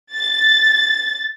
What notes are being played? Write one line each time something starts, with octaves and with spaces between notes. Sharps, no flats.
A6